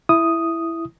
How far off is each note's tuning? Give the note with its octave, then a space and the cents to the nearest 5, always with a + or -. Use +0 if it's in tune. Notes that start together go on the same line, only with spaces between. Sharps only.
E4 +5 D#6 +0